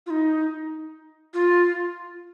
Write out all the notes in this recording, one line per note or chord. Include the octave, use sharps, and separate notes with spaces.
F4
D#4
F4